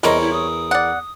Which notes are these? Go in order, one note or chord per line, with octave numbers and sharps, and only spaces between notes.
E2 G3 C4 A#4 C#5 D#5
E4
D#6
D5 F#5